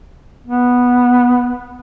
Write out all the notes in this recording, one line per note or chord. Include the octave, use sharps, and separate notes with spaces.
B3